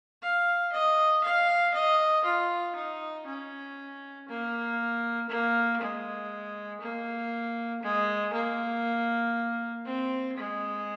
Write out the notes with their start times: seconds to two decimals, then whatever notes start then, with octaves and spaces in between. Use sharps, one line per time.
0.23 F5
0.73 D#5
1.24 F5
1.74 D#5
2.25 F4
2.75 D#4
3.27 C#4
4.28 A#3
5.29 A#3
5.80 G#3
6.81 A#3
7.82 G#3
8.33 A#3
9.85 C4
10.36 G#3